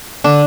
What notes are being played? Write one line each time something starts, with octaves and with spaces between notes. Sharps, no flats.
D3 D4